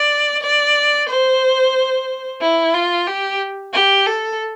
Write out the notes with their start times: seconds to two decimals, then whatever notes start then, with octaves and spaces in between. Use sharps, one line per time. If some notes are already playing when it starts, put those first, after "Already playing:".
Already playing: D5
0.43 D5
1.09 C5
2.41 E4
2.74 F4
3.07 G4
3.73 G4
4.06 A4